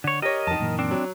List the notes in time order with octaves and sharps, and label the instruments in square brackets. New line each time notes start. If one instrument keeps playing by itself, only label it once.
[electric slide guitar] D3 C#5
[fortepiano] G4 C#5 [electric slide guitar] A#4 D#5
[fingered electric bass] F2 [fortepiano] D#3 A5
[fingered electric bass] F#2 A#2 E3
[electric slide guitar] C4 D4
[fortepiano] F#3